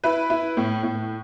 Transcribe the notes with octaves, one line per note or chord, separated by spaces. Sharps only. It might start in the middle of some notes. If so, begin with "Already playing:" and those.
E4 B4
E4
A2
A2